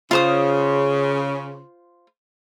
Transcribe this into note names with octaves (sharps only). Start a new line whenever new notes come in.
C#3 F4 C5 D#6